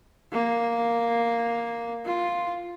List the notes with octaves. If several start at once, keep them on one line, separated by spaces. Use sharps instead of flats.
A#3
F4